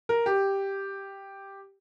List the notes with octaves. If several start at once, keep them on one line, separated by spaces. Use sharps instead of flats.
A#4
G4